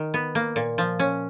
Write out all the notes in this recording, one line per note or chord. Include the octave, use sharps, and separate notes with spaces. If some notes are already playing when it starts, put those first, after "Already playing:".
Already playing: D#3
B3
A#3
A#2
F3
C#4